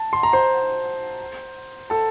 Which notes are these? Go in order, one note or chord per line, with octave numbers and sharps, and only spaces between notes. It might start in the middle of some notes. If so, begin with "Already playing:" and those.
Already playing: A5
C6
A#5
C5 C6
A4 A5